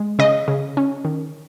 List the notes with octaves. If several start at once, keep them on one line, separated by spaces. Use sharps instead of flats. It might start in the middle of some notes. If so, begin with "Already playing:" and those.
Already playing: G#3
C#3 D#5
C#3
C#4
D#3